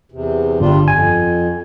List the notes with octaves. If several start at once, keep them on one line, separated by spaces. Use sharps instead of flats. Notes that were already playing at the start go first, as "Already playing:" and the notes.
E2 C3
G1 G3 D4 F4
F2 G#5